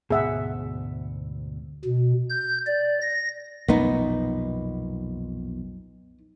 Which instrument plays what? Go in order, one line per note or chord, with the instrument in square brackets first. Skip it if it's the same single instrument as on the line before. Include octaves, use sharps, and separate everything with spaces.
[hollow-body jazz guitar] D2 G#2 B2 [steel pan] G#4 E5 F#5
[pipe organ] B2
G6
D5
A#6
[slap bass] B1 F2 A#2 [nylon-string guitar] B3 D#4